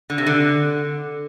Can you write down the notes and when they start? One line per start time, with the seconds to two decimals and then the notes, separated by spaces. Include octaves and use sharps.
0.10 D3
0.18 C3
0.26 D3